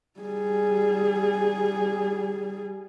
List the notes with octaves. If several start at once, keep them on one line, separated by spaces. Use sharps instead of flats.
G3 G#4